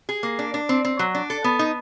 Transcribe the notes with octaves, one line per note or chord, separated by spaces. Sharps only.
G#4
A#3
D4
D4
C4
C4
F#3
D4
A4
B3
D#4